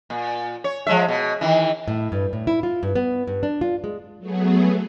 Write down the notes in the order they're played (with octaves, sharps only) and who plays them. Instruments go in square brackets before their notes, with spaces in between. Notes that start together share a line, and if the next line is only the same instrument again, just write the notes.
[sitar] A#2
C#5
F3 G#3 E5
B2
D#3 E3
[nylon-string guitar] A2
G2
A2
E4
F4
G2
B3
G2
D4
F4
G#3
[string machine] F#3 A3 B3 G#4